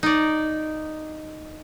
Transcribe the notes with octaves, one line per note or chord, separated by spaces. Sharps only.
D#4 D5